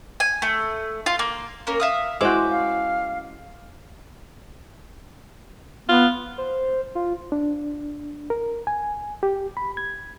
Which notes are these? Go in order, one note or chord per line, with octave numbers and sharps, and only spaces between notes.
G#5
A3
F4
A#3
A#3 C#4 A#4
E5 F5 D#6
G#3 C#4 E4 F#4 C5 D6 E6
F5
B3 F4
C5
F4
D4
A#4
G#5
G4
B5
G#6